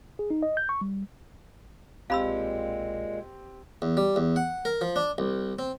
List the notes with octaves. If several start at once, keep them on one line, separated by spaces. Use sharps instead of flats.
G#4
D#4
D#5
G6
C#6
G3
B1 A#2 G#3 C4 G4 F5 B5 E6
E2
G3
E2
F#5
A#4
F3
D4
C2
C4